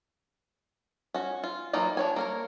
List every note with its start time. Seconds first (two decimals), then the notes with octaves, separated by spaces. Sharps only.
1.14 C#4 F#4
1.44 F4
1.73 E3 F#3 A#3 D#4 F4
1.97 D4 C#5 G#5
2.16 A#3 A#4 C#5